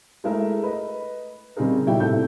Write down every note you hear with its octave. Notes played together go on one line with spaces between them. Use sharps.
G#3 A3 E4 G#4 A#4 E5
B4 D#5
C#3 G3 C4 D#4 G#4 A#4
B2 G3 E4 G5
A2 C3 E4 A4 G6